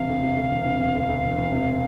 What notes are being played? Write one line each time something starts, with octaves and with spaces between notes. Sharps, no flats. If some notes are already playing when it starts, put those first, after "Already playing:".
Already playing: E1 C3 F5
D2
C3
D2
E1
C3
E1
D2
D2
E1
E1
C3